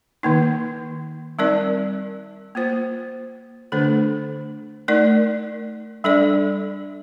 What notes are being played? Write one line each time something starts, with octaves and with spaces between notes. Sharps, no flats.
D#3 A#3 D#4
G3 C4 D#4 A#4 D5
A#3 F4 C5
D3 A3 D4 A4 C5
A3 D#4 A#4 D5
G3 D4 A4 D5